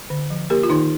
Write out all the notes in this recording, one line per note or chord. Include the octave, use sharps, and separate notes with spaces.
D3
F3
A#3 G4 A#4
F4
D#3 D#4